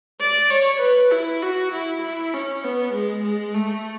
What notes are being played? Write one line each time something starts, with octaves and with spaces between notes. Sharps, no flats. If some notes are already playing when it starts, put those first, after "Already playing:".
D5
C#5
B4
E4
F#4
E4
E4
C#4
B3
G#3
G#3
A3